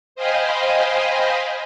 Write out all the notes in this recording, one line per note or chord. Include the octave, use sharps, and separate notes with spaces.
C5 D#5 F5 G5 G#5 B5